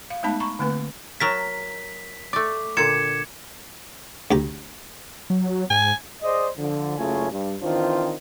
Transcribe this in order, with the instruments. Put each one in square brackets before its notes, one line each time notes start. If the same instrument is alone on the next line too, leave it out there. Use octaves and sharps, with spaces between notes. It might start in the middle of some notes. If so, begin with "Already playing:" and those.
[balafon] F5
G#3 A3 B3 D#4 A5 B5
A#5 B5 C#6
D3 A3 A#3 C4 B4
[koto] F#3 A#4 A5 [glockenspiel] B6
[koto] A3 D5 [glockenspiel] D6
[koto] A#2 D3 [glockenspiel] G#6 C#7 E7
[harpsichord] D2 G4 A#5
[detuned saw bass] F#3
[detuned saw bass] G#2 [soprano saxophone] G#5
[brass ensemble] G#4 C5 D5 D#5
D3 F3
F#1 C#3 A3 C#4 F4 G#5
G2
D#3 E3 C4 D4 F4 C5